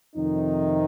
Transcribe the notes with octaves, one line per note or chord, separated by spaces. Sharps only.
F2 C3 D#3 D#4